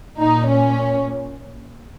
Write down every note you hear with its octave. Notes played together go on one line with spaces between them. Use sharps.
A#2 D#4
C#4